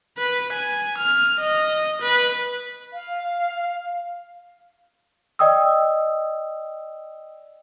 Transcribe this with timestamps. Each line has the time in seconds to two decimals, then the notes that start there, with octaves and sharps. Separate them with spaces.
0.18 B4
0.53 G#5
0.98 F6
1.39 D#5
2.02 B4
2.93 F5
5.39 D5 D#5 G5 D#6 E6